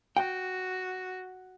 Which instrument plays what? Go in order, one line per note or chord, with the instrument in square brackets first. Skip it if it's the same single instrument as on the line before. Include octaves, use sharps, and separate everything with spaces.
[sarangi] F#4 [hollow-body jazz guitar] G5